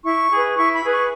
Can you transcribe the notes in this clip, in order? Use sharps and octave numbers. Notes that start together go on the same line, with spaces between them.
E4 C#6
G#4 B4
E4 C#6
B5
G#4 B4
C#6